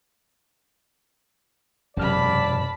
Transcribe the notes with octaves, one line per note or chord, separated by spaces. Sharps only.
E1 F#2 C3 D5 A5 B5 F6